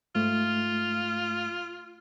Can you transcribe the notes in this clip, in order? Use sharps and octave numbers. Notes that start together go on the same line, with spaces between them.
G#2 A3 F4